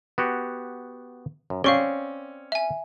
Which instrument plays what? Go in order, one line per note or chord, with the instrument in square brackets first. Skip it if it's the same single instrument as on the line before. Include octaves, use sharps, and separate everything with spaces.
[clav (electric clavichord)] B3 F#4 G4
F#2
[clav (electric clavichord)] C4 D5 [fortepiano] C#4 [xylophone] F5 C#6 G7
[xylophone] E5 G#5